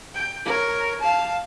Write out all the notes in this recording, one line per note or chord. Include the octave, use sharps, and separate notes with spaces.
G5
A#4 C#5
F5 A5